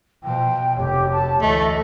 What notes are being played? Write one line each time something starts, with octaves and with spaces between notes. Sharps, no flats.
B2 F3 G5
F1 G4 C#5
A5
D2 E3 A3 D#5